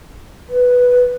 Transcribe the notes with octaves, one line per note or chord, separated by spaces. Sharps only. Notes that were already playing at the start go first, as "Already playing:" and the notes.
B4